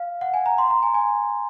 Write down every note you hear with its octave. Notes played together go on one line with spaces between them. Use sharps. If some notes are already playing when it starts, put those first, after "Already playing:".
Already playing: F5
F#5
G#5
A#5
C6
A#5
G#5
G#5